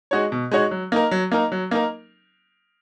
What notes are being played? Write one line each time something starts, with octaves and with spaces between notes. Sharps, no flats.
G#3 D#4 F#4 C#5
B2
G#3 D#4 F#4 C#5
F#3
A#3 D#4 A#4
F#3
A#3 D#4 A#4
F#3
A#3 D#4 A#4